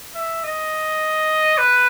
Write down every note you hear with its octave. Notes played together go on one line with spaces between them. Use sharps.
E5
D#5
B4